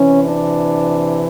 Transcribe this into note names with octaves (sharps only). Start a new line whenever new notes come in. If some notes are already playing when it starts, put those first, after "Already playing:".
Already playing: C3 E3 C#4
D4